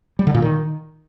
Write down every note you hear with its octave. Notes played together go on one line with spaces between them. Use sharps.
G3
D3
A#2
D#3